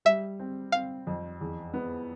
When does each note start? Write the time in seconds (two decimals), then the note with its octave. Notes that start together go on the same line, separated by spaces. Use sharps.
0.05 G3 E5
0.40 C4
0.72 C4 F5
1.07 F2
1.41 E2
1.74 B3